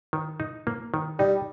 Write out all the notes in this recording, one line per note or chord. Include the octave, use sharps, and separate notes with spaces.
D#3
D#4
A#3
D#3
G3 D#4